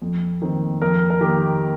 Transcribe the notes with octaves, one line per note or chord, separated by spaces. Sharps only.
F2
D#3 C4
F2 A#4
A#4
D#3 A#3 G4